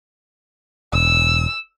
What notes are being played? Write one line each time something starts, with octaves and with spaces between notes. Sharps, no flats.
E1 E6